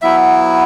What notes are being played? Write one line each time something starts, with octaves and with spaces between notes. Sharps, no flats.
F#3 B3 E4 E5